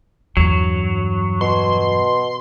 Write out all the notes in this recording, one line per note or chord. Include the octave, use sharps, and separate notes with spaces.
E2 G2 F#3
B2 C6